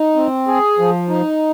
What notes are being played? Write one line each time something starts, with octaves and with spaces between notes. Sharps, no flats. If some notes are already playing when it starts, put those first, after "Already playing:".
Already playing: D#4
C4
G#4
F3
D#4